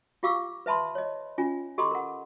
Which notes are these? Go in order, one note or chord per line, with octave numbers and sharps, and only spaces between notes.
F4 G4 F5 C#6 D6 E6
B4 E5 A5 B5 C6
C#5 D#5
C#4 F4 G#5
G4 A4 D#5 B5 C6 D6
A#4 F#5